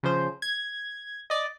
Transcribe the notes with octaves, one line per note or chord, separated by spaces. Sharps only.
C#3 F3 C5
G#6
D5 D#5